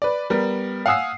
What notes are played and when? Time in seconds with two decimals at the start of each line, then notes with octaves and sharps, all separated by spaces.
0.02 B4 D5
0.30 G3 B3 A#4
0.86 F5 F#5 G#5 D#6 E6 C7